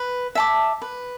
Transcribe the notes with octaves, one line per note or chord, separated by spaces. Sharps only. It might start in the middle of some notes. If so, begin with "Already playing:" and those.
Already playing: B4
E5 A5 D6
B4